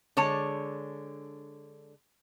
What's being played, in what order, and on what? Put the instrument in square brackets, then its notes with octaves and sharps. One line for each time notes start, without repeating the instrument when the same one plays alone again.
[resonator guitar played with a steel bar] D3 G#3 C#5 A5